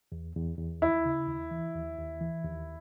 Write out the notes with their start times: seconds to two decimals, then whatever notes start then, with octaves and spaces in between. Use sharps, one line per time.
0.12 E2
0.36 E2
0.58 E2
0.82 D#2 E4
1.06 C#3
1.28 D#2
1.51 E3
1.74 D#2
1.98 D#2
2.21 E3
2.44 D#2